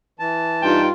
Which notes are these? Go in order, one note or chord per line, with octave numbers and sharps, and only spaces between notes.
E3 A5
G2 D#4 F4 G5